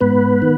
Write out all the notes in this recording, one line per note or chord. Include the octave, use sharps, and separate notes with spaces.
G#2 B3 B4
D#3